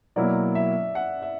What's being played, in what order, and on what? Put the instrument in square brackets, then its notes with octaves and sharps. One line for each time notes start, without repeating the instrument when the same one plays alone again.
[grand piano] B2 F#3 A#3 E4 [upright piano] D5
[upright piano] E5
F#5
E5